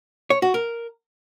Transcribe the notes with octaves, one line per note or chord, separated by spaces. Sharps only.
C#5
F#4
A#4